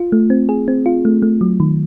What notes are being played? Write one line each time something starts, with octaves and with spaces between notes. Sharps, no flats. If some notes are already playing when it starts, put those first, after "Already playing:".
Already playing: F4
A3
C4
G#4
C4
F4
A3
A3
F#3
D#3